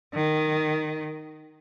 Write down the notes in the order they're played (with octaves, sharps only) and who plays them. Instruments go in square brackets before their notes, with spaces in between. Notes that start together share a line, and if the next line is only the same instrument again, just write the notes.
[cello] D#3